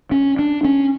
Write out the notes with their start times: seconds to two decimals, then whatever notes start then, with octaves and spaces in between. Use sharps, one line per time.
0.12 C#4
0.39 D4
0.64 C#4